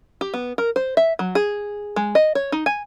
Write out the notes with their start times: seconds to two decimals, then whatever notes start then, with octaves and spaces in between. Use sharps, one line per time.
0.21 G4
0.34 B3
0.58 A#4
0.76 C5
0.97 E5
1.19 F#3
1.35 G#4
1.96 G#3
2.15 D#5
2.35 C#5
2.52 D#4
2.66 G#5